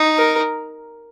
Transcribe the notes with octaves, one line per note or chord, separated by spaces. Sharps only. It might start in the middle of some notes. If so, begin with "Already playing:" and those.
Already playing: D#4
A#4